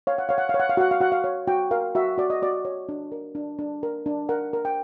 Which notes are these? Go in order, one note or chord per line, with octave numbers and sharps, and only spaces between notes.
C#5 F5
F#5
C#5 F5
F#5
F5
C#5
F#5
F5
F#4 F#5
F5
F#4 F#5
F5
C#5
F#4 G5
A#4 F5
F#4 E5
F#4 D5
D#5
F#4 D5
C#5
D4
A#4
D4
D4
A#4
D4
A#4 F#5
A#4
G5